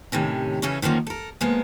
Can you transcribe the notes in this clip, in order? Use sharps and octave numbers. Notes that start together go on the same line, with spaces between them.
A2 C3 D#3 C#4
C#3 E3 C#4 A4 C#5
D3 D#3 F3 A#3 C#4
A4 A#4
F3 G#3 A#3 B3